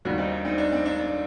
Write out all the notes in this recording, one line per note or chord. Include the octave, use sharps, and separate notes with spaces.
D#2 D#3 G3 D4 F#4
C4 D#4
D4
C4 D#4
D4
C4
D4
D4